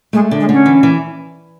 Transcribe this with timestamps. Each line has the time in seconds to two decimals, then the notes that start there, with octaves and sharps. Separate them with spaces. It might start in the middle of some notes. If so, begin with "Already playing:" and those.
0.13 G#3 A3
0.31 D3
0.40 G#3
0.49 D3 C#4
0.66 E3
0.83 E3